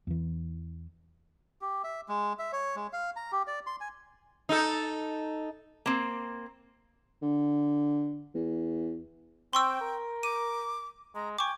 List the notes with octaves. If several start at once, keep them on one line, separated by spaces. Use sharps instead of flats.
E2 E3
G4
E5
G#3
E5
C#5
G#3
F5
A#5
G4
D5
C6
G#5
D#4 A4
A#3 C4
D3
E2
C4 G5 C6 C#6 E6
A#4
D6 D#7
G#3 A#5
G5 G#5 C#6 D6